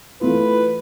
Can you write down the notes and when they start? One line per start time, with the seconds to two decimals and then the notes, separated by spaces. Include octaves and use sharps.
0.21 E3 A3 F4 B4